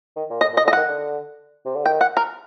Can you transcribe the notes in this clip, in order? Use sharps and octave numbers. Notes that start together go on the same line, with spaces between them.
D#3
A#2
A2 D#5
A#2
D#5
D3
D#5
D#3 F#5
D3
C3
D3
D#3 G5
F#5
A#4